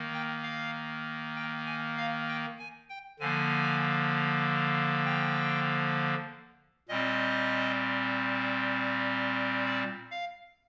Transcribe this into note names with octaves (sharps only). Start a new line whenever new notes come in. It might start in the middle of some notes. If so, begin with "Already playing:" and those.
Already playing: D#3 A#3
G5
F5
G5
G#5
F5
G5
G#5
G5
D3 F3 A#3 G#5
G5
A#2 G3 C4 D#5
D5
F5